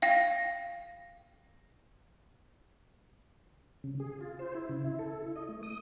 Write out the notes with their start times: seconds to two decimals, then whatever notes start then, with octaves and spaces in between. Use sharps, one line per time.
0.02 F5 G5 A#6
3.84 C#3
4.00 G#4
4.21 F4
4.39 C5
4.55 E4
4.69 C#3
4.84 E4
4.99 A4
5.22 E4
5.36 D#5
5.49 A3
5.63 D#6